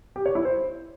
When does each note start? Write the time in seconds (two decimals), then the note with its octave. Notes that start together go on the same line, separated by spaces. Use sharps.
0.16 G4
0.26 C#5
0.35 E4
0.45 C5